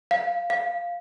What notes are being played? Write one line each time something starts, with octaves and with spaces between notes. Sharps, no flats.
F5
F5